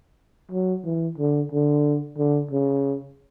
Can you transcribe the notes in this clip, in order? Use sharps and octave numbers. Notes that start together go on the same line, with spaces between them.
F#3
E3
D3
D3
D3
C#3